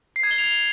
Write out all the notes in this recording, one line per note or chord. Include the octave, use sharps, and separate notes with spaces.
C7
G#6
G7
F7